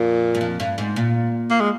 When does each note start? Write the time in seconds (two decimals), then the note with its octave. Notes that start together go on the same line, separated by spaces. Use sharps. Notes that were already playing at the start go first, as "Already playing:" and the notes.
Already playing: F2 A#2
0.35 G2
0.41 F2
0.60 G2
0.78 G#2
0.96 A#2
1.50 A#3
1.60 G#3